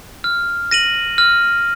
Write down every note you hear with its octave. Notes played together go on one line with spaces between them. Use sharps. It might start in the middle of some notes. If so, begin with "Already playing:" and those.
F6
A#6 D#7 F#7
F6